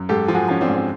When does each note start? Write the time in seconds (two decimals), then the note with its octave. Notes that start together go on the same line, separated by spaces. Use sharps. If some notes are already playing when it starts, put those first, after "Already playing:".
Already playing: F#2
0.09 G#2 G4 A4
0.28 F3
0.35 F#4 G#4
0.48 F3 C#4
0.61 C4 D4
0.68 G#2
0.75 C4